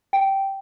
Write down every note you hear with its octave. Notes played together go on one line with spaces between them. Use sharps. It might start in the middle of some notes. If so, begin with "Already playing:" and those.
G5